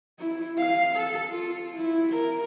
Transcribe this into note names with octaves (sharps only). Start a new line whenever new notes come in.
E4
F5
A4
F4
E4
A#4